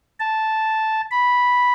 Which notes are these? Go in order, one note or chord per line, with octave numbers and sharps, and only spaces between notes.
A5
B5